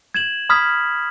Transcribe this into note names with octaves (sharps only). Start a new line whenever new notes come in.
G#6 E7 F#7
B5 D#6 F6 G#6 B6